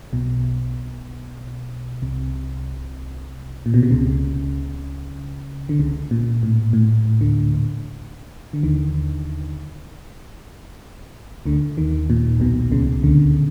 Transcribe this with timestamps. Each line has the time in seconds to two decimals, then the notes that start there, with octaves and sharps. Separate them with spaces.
0.13 B1 B2
2.02 C2 C3
3.66 A#2
3.74 B2
3.83 C3
3.91 C#2 C#3
5.69 D3
5.79 C#2 C#3
6.11 A#2
6.43 A2
6.73 A2
7.21 D2 D3
8.53 D3
8.63 D#2 D#3
11.46 D2 D3
11.77 D#2 D#3
12.10 A#2
12.40 B1 B2
12.72 C#2 C#3
13.04 D2 D3